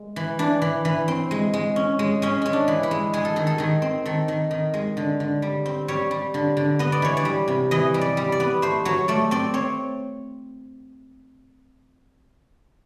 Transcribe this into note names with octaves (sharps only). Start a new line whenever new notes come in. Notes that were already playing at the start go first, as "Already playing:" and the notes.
Already playing: G#3
E3
E3 D4
E3
E3
C4
G#3
G#3
C#4
G#3
G#3 C#4
G#3 C#4
D4
E3
E4
G#3
G#3 G#4
A4
D#3 G#4
A4
D#3 G#4
C4
D#3 A4
D#3
D#3
G#3
D3
D3
G3
C4
G3 C#5
G3
D3
D3
B3 D#5
D5
E3 C#5
D5
G3
C3
E3 D#5
G3
D5
G3
D5
B3
A3 C5
F#3 C#5
A3 D5
C4 D5
C4 C#5